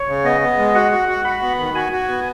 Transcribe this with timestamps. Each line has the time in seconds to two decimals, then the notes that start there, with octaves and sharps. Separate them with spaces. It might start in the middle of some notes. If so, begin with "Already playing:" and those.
Already playing: C#5
0.08 C#3
0.24 B3 D#5
0.41 B3
0.58 G#3
0.75 F#4 F#5
0.92 F#4
1.08 F#4
1.24 F#4 B5
1.42 B3
1.59 D#3
1.75 F#4 G#5
1.92 F#4
2.09 B3